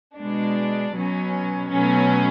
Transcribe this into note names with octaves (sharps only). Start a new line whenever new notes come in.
B2 G#3 D4
B2 F#3 C#4
B2 F#3 A3 C#4